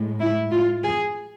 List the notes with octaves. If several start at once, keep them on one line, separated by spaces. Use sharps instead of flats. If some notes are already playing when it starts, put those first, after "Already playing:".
Already playing: A2 G#3
E4
F4
G#4